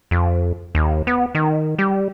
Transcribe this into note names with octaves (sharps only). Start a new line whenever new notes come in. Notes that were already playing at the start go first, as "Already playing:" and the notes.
F2
D#2
B3
D#3
G3